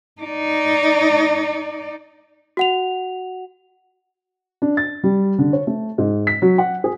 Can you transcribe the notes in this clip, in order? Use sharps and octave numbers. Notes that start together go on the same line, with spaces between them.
D#4 D5
F#4 F#5 F7
D4
A6
G3
D3
C#5
A3
G#2
B6
F#3
F#5
G#4